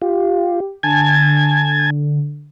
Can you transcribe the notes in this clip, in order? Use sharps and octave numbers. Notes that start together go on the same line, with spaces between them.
F4 G4
D3 G#5 A5 G#6